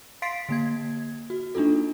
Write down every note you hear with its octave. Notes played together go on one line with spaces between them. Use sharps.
F5 C6 A6 B6 C7 D7
D3 A#3 G#6
F#4
A#3 D4 D#4 F4 A4